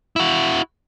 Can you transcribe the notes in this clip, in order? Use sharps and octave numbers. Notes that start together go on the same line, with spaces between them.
E4 F#4